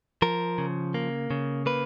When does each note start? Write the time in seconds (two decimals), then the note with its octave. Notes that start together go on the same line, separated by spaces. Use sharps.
0.22 F3 A#4
0.58 C#3
0.94 A#3
1.31 C#3
1.66 A#3 B4